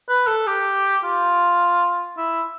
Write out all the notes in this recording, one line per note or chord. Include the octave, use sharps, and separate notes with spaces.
B4
A4
G4
F4
E4